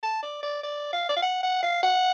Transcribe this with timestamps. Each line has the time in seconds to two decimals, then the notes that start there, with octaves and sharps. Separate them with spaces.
0.03 A5
0.22 D5
0.43 D5
0.63 D5
0.93 F5
1.09 D5
1.16 F5
1.22 F#5
1.43 F#5
1.63 F5
1.83 F#5